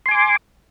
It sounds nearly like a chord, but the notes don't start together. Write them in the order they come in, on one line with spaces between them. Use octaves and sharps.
C6 G#5 D6